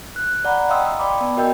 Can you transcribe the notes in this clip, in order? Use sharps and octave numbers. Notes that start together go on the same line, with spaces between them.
F#6
D5 F#5 A#5 B5
D#5 F5 G5 C6 D#6 E6
D5 G5 B5 D6
B3 D5 A5
F#4 A#4 D#5 G5 E6 G6